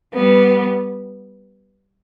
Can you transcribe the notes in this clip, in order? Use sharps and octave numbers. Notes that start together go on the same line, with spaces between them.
G3 B3